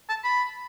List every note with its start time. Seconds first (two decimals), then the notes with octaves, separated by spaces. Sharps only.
0.09 A5
0.24 B5